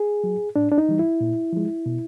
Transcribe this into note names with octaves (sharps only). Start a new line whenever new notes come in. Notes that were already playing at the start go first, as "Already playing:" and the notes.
Already playing: G#4
F#3
A2 D4
D4
D#4
E3 G3
E4
A#2
F3 G#3
B2